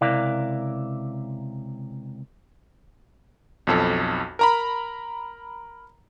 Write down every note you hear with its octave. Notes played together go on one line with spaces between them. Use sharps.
C#2 C3 E4 A#4 D5 F5
B1 F2 A4
A#4 A#5 B5